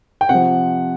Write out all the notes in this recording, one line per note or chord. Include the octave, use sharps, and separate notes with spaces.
G5
C3 F3 F#5